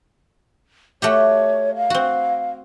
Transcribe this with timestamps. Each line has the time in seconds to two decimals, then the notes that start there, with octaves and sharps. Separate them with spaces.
1.02 A3 F#4 G4 C#5
1.76 F5
1.90 C4 F#4